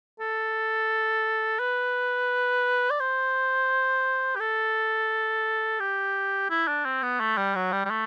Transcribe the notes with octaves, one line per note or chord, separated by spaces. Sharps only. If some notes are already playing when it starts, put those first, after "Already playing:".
A4
B4
D5
C5
G4
A4
G4
E4
D4
C4
B3
A3
G3
F#3
G3
G3
A3